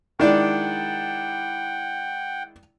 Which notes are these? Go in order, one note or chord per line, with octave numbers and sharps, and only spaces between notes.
D#3 G#3 D4 E4 D5 F#5 G5